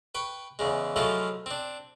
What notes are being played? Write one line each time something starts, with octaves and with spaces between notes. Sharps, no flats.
B4 G5 C#6
E2 C#3 G#3
F3 F#3 G#3 A3 E4 F4
C4 D4